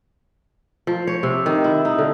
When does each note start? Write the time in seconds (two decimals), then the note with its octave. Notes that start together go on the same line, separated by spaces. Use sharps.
0.87 F3
1.07 C#5
1.23 C3
1.46 D#3
1.64 E4
1.85 D#4
1.98 D3